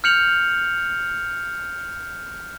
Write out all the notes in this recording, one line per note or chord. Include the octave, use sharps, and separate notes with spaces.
F6 G6 C#7 F7 F#7